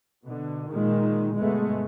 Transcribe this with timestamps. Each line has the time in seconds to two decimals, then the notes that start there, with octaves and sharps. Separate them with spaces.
0.25 B2 D3
0.71 A#2 D#3 G#3
1.37 G1 G2 B2 G#3 A3 B3